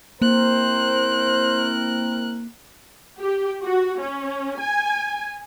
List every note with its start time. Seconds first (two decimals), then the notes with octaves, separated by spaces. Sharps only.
0.22 A#3 C4 E4 A#4 C5 F#6
3.21 G4
3.63 F#4
4.01 C#4
4.59 G#5